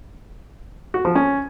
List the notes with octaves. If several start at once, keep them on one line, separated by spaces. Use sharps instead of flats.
F#4
F3
C#4